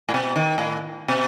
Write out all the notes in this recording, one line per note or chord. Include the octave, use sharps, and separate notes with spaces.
A2
B2
D#3
A2
B2